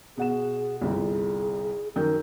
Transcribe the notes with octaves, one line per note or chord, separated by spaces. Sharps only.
B2 G#4 F#5 E7
G1 C2 G#4
F#2 D#3 A#4 G6